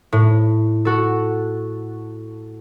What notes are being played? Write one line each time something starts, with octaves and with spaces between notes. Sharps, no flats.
A2
F#4 A4